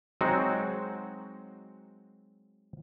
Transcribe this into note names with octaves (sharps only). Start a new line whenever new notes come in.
F#3 G#3 C4 D#4 F#4